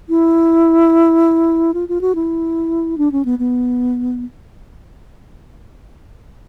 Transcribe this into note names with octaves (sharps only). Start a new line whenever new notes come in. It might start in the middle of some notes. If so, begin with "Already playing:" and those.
E4
F4
F4
F#4
E4
D4
C#4
B3
B3